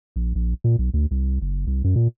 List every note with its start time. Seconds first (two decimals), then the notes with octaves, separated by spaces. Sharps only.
0.16 A#1
0.35 A#1
0.64 A#2
0.79 B1
0.94 D2
1.11 C2
1.42 F#1
1.67 C2
1.84 F#2
1.96 A#2